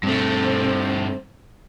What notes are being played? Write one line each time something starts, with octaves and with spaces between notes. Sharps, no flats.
G2 A3 C4